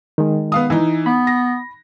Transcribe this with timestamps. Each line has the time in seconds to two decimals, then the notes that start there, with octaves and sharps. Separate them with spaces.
0.18 D#3 G#3
0.52 B3 F5 D#6
0.70 E3 D#4
1.06 B3 B5
1.27 A#6